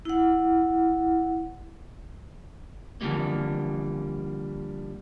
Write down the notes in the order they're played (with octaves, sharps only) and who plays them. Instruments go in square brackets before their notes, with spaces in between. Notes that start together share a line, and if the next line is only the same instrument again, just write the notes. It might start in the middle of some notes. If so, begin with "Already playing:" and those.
[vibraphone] E4 F#5
[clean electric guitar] D3 E3 F3 G3 A#3